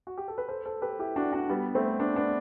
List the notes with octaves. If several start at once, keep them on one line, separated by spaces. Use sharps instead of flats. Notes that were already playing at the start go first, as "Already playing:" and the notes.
F#4
G4
A4
B4
A4 C5
A4 C5
G4 B4
E4 G4
D4 F#4
D4 F#4
G3 B3
A3 C4
B3 D4
B3 D4